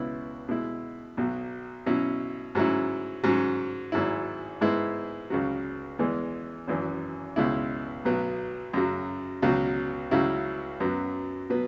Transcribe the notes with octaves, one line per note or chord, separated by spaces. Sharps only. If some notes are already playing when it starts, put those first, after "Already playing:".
Already playing: C#2 B2 B3 E4
B2 G#3 E4
B1 B2 F#3
B2 F#3 C#4 E4
G#2 F#3 C#4 E4
G#2 F#3 C#4
G#1 G#2 F#3 E4
G#2 G#3 B3 E4
C#2 C#3 F#3
E2 E3 G#3
G#1 F#2 E3
C#2 B2 G#3 E4
B1 B2 F#3 B3
F#2 C#3 F#3
C#2 B2 F#3
C#2 C#3 F#3 E4
F#2 F#3 B3
B2 F#3 B3